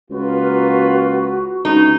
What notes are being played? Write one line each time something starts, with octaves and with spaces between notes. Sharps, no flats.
C#2 A#3 F4 F#4 B4
C#2 D#4